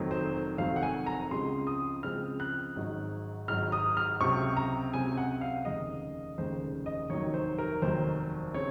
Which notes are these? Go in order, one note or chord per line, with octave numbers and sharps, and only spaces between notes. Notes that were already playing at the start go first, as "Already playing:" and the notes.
Already playing: F1 F2 D#3 F#3 C4
C5
F1 F2 D#3 F#3 C4 F5
F#5
G#5
A#5
C#2 C#3 F3 G#3 C4 C6
D#6
C#2 C#3 F3 G#3 C4 F6
F#6
G#1 G#2 F#3
G#1 G#2 F#3 F6
D#6
F6
C#2 C3 F#3 C4 C#6
A#5
C#2 C3 F#3 C4 G#5
F#5
F5
F1 D#2 C#3 D#5
F1 D#2 C#3 C5
D#5
F1 D#2 D#3 F#3 C#5
C5
A#4
F1 D#2 D#3 F#3 C5
C#3 C4 C#5